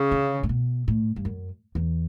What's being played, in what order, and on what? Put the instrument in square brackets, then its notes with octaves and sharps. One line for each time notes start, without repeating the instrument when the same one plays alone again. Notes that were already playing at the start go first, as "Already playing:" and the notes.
Already playing: [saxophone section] C#3
[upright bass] D3
A2
B2
A2
G2
F#2
E2